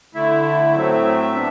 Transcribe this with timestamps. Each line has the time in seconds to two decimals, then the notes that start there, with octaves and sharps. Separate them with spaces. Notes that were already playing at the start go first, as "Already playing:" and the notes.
0.15 D3 A3 E4 E5
0.75 A2 F#3 A3 C4
1.34 B3 D4